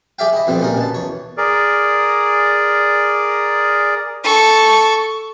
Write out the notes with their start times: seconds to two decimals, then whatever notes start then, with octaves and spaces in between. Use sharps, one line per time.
0.19 G4 G#4 D5 E5 F5 G5
0.33 E4 D#5
0.47 F2 B2 G3 C4
0.60 A#2 G3 C#4 A#4
0.77 B2 A5
0.94 E2 C#5
1.37 G#4 A#4 D5
4.24 A4 C#6